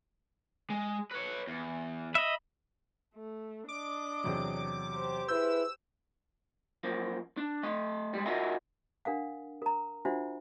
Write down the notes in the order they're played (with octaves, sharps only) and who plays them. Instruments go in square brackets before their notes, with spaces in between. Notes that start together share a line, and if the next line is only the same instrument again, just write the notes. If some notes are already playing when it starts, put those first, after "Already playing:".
[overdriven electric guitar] G#3
B4 C#5
E2
[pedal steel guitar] D#5 E5 [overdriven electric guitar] B5
[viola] A3
[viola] D4 D#5 [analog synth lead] D6
[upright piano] E2 C3 F#3
[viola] G4 C5
[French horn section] E4 G#4 B4 [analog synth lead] E6 [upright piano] G6
[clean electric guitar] F#2 F3 A#3
D4
A3 D#5
G3 G#3
F4 F#4 G#4 A#4 D#5 E5
[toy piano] D4 A#4 F5 F#5
A#4 A#5
D4 F4 F#4 C5 E5 F#5